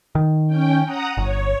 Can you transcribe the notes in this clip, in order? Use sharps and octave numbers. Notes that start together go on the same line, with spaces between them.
D#3
C#4 G5
F#5 A#5 D#6
G1 C#5